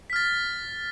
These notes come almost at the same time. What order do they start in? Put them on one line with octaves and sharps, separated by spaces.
B6 F6 A6